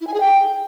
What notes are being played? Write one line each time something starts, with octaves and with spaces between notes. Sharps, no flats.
E4
G#5
G#4
G5